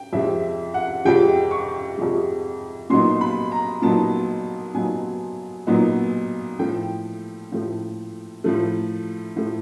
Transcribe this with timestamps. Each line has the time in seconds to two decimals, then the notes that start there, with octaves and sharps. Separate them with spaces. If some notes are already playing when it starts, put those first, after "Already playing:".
Already playing: G5
0.13 F2 C3 F3 G#3 E5
0.74 F#5
1.05 F2 C3 F3 G#3 G5
1.51 C#6
1.97 F2 C3 F3 G#3
2.90 A#2 F#3 B3 D#4 C6
3.21 B5
3.52 A#5
3.82 A#2 F#3 B3 D#4 A5
4.75 A#2 F#3 B3 D#4 G#5
5.67 A#2 F#3 B3 D#4
6.59 A2 F3 A3 G5
7.52 A2 F3 A3
8.44 A2 F3 A3
9.36 A2 F3 A3